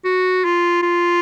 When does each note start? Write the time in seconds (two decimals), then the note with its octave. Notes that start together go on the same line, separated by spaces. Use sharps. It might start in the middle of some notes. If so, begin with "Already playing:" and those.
0.05 F#4
0.45 F4
0.82 F4